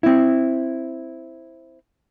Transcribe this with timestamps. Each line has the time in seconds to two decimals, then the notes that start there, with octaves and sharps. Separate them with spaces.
0.03 C4 E4